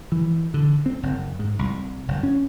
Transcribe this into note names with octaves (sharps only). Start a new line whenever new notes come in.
E3
D3
C4
F#1
G#2
C2
F#1
C#4